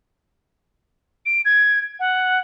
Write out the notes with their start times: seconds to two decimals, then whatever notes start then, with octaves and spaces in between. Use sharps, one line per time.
1.26 D7
1.45 G#6
2.00 F#5